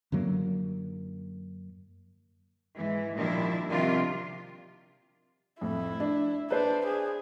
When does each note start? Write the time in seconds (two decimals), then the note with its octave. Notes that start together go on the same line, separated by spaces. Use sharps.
0.12 F#2 D3 F#3 A#3
2.75 G#2 E3
3.15 A#2 D#3 F3 G3 D4 E4
3.71 C3 D#3 F3 G3 D4 F4
5.61 F2 A2 E4
6.00 D4
6.50 D4 B4 C5
6.87 G#4